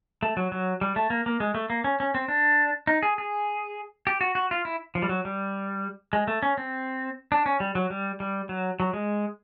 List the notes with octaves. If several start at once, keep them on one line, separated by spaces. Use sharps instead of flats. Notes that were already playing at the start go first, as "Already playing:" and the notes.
A3
F#3
F#3
G3
A3
A#3
A#3
G#3
A3
A#3
C#4
C#4
C4
D4
D#4
G#4
G#4
G4
F#4
F#4
F4
E4
F3
G3
F#3
G3
G#3
A3
C#4
C4
D4
C#4
G3
F#3
G3
G3
F#3
F#3
G#3